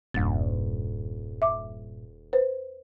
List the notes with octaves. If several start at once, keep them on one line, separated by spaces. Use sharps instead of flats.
D#1 E2 G2 A#2 A6
E5 D6
B4 C5